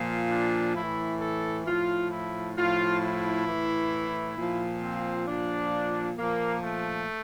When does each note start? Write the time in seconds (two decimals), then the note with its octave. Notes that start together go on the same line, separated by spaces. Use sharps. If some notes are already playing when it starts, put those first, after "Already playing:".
Already playing: A#2 F3
0.30 D4
0.76 A2 E3 E4
1.21 A4
1.66 A2 F3 F4
2.11 E4
2.57 A2 F3 F4
3.01 E4
3.47 A2 E3
4.37 A#2 F3
4.82 C4
5.28 A#2 F3 D4
6.18 A#2 F3 A#3
6.63 A3